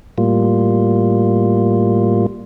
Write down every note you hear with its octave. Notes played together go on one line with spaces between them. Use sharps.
A2 G3 A#3 F4